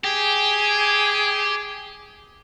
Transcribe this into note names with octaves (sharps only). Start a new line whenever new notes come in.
G4 G#4